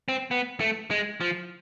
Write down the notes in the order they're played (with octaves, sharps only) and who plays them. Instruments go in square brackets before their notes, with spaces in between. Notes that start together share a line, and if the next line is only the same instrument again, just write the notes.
[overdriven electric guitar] C4
B3
A3
G#3
F3